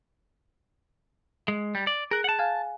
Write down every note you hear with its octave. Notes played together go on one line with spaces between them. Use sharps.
G#3
G3
D5
G#4 A#4 F#6
F#5 A5
F5 G#5